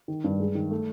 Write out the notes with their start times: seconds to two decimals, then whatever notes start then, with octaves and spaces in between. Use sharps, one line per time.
0.08 D#3
0.24 G2
0.40 G#3
0.55 D#3
0.71 A3